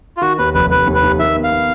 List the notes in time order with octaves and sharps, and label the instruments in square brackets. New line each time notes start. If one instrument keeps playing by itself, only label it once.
[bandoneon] F4
[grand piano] D#3 [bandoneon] F#4
[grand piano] D#2 [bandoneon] B4
[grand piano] F1 [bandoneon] B4
[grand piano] F1 [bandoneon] B4
[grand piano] D#2
[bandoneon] B4
[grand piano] D#2
[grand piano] D#3 [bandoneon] E5
[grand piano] B3
[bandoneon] F5
[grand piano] B3